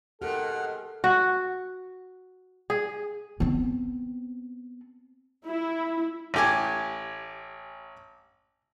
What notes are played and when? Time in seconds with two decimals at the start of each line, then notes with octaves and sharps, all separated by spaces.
0.22 G#2 B2 G4 A4 A#4 F#5 F6
1.04 F#4
2.70 G#4
3.40 B3 C4
5.46 E4
6.34 A1 G4 G#5